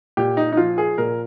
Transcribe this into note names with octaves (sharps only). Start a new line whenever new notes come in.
A#2 G4
D#4
D#4
F3 F4
G#4
A#2 A#4